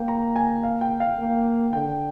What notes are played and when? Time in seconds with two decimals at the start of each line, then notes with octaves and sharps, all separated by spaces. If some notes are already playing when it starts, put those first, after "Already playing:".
Already playing: A#3 G5
0.08 A#5
0.36 G#5
0.63 F5
0.81 G5
1.00 F5
1.19 A#3
1.73 D3 G5